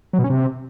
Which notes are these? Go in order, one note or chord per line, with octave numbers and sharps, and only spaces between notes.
F#3
B2
C#4
C3